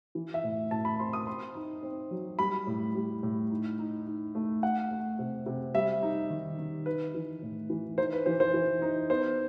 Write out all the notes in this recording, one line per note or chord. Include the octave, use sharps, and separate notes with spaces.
E3
E5
A2
A2 A5
B5
C4 C6
D#6
C4 C6
D#4
C4
F#3
G3 B5
A2
G3
A2
D#4
D#4
D#4
A3
A3 F#5
A3
C3
C3
G3 E5
D#4
D#3
D#3
D#4 B4
E3
A2
E3
D#4 C5
B4
E3 C5
C5
E3
D#4
B3 C5